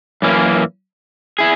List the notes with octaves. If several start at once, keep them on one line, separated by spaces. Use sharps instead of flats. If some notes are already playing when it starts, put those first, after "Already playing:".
F#2 E3 A#3 C#4
E4 G#4